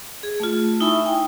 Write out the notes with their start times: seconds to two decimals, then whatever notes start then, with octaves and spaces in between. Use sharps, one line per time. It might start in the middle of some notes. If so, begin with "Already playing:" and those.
0.23 G#4
0.40 A3 F4
0.80 D#4 E4 E5 G#5 B5 C#6
1.06 D#4 G5 G#5